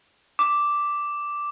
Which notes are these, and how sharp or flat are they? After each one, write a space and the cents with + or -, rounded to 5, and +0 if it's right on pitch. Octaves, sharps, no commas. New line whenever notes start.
D6 -5